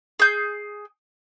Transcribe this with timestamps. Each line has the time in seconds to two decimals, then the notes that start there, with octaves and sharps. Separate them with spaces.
0.20 G#4 G6